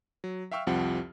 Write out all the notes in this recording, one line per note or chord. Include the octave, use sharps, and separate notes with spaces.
F#3
E5 F5 G5 C#6 E6 F6
C2 F2 F3 G4 F#5